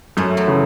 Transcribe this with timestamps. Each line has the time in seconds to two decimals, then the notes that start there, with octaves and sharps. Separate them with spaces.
0.17 F#2 A3 C#4
0.37 F#3 A3
0.47 C#3 E3